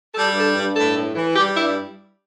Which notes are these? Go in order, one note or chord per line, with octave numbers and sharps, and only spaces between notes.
G3 A4
G4
G2 A4
G2
A2 A4
A2
E3
G3 G4
G2 E4